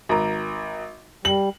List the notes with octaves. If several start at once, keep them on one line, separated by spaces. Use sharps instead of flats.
G#1 A#5
G3 F#7